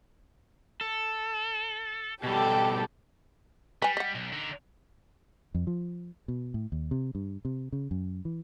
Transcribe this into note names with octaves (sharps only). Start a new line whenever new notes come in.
A4
B2 G3 G4 A4
G3 B4 G#5
D#5 F#5
B1
D3 D#4
F2
F3
B2
A2
D#2
C3
G2
C3
C#3
F#2
E3